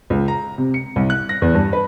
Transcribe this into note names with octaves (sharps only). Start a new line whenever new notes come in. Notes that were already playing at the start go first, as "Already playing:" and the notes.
C#2
A#5
C3
C#7
C2
F#6
A#6
E2
G2
B4